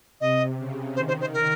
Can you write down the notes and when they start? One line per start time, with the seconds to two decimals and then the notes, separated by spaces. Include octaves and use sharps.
0.20 C3 D#5
0.58 C#3
0.95 D#3 C5
1.07 C5
1.20 C5
1.33 A#4